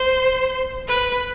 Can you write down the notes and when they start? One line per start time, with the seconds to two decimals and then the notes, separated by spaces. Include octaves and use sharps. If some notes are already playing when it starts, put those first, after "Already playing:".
Already playing: C5
0.88 B4